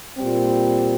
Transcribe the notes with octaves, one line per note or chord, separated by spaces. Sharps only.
A#2 G3 C4